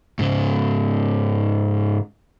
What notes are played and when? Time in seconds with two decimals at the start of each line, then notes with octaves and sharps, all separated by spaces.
0.19 G#2 C#3